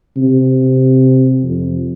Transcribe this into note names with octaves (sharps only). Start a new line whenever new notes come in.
C3
F2